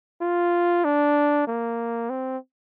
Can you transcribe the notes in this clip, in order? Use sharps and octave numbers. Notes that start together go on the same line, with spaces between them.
F4
D4
A#3
C4